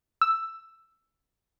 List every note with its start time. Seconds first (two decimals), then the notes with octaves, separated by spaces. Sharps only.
0.21 E6